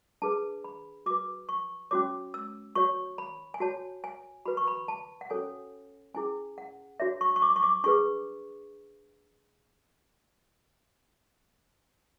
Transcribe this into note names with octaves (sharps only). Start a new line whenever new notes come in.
D4 G#4 B4 A5
B5
F#4 B4 D6
C#6
C#4 F#4 C#5 D6
E6
F#4 C#5 C#6
B5
G#5
F#4 C#5 A5
G#5
F#4 B4 B5
C#6
B5
A5
F#5
C#4 F#4 A4 C#5 G#5
C#4 E4 G#4 G#5
F#5
D4 F#4 C#5 E5
C#6
C#6
D6
C#6
D6
D4 G#4 B4 C#6